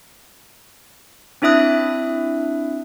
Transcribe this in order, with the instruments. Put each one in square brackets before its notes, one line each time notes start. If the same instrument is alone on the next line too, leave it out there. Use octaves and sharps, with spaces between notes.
[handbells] C4 D4 E4 E5 D#6 F#6